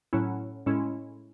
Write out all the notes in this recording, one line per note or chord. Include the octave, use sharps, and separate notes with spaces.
A2 F#3 C#4 E4
A2 G#3 C#4 E4